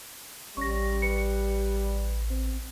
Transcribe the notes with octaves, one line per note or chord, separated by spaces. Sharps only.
A1 G3 C#4 C#6 A#6
B4 C#7
C4